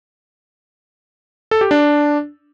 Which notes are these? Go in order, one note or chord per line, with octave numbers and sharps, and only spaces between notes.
A4
G4
D4